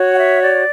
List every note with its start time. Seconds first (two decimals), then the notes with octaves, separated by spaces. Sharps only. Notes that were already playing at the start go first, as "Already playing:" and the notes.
Already playing: F#4 C#5
0.13 F#5
0.18 E5
0.43 D5